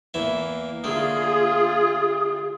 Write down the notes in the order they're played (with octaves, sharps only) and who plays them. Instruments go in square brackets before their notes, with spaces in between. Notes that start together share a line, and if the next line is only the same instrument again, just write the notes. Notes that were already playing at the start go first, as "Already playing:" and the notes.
[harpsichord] E2 E3 E5 [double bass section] A#3
[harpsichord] D3 A3 [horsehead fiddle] F4 G#4 [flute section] D#6